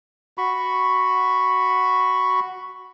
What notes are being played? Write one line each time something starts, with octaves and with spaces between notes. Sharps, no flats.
F#4 B5 C#6